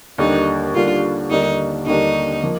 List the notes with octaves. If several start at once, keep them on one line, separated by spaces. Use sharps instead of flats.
D#2 D3 G3 A#3 D4 D#4
D#2 D3 G3 A#3 D4 F4
D#2 D3 G3 A#3 D4 D#4
D#2 D3 G3 A#3 D4 D#4
F3 A#3